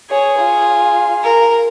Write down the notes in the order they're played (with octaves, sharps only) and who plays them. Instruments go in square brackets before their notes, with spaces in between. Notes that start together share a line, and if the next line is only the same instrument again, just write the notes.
[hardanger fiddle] G#4 [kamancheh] C#5
[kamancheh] F4
[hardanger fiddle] A#4